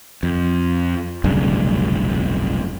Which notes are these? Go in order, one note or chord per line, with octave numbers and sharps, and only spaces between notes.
F2
F1 B1 G2 C#3